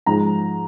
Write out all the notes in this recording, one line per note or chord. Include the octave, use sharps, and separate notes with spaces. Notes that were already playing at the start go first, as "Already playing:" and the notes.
G#2 F3 G#3 D#4 A#5